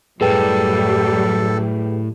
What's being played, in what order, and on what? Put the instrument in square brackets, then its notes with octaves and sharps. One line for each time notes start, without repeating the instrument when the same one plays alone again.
[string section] F#2 F#3 G3 [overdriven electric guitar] A2 [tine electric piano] G#4 B4 G5 [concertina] A4